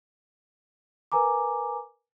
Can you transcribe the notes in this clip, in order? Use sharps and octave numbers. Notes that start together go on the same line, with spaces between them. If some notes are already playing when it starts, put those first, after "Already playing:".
A#4 B4 G#5 A#5 D6